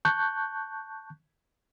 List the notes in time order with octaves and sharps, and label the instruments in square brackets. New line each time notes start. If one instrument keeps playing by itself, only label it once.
[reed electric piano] A5 C#6 F#6 G6